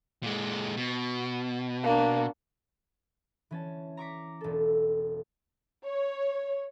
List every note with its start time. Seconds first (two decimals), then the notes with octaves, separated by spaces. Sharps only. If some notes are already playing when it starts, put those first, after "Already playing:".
0.23 A#2 G#3
0.77 B2
1.83 A#3 D4
3.51 E3 C#4 A5
3.97 A#5 C#6 D6 B6
4.41 E1 A4
5.85 C#5